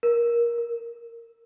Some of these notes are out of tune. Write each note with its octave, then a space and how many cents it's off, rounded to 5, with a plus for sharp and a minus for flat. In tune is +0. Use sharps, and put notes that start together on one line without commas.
A#4 +15
A#4 -10